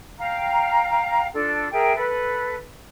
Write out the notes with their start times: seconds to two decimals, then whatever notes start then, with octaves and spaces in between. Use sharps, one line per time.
0.19 F5 G5 A#5
1.34 D4 F4 A4
1.71 G#4 A#4 E5 G5
1.95 A4 B4